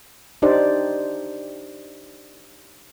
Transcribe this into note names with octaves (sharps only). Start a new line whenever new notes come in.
D4 D#4 G4 C5 D5